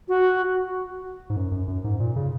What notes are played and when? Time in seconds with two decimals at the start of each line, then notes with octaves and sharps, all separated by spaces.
0.08 F#4
1.30 G#2
1.36 F#2
1.51 F#2
1.68 F#2
1.84 G#2
2.00 A#2
2.16 C#3